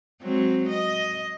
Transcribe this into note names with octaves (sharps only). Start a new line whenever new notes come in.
F#3 G#3 C4
D#5